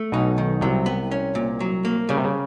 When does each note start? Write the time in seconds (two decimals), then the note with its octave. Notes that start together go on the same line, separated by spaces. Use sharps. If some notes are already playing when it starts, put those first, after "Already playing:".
Already playing: A3
0.12 B1 B2 D#4
0.38 D#3
0.61 C2 C3 F#3
0.86 B3
1.11 C#4
1.35 A#2
1.60 F#3
1.85 A#3
2.09 C#3 G3
2.17 C3
2.24 C#3